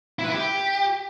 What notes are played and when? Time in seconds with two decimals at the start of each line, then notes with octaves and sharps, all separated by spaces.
0.19 E4
0.24 B4
0.29 E4
0.34 G4